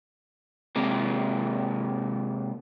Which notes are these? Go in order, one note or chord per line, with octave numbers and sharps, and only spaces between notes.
C3 G#3 A#3